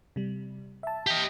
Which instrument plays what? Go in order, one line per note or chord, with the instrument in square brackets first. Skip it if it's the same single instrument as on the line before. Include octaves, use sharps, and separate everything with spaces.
[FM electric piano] C3 G3
E5 A5
[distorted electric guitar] G4 D#5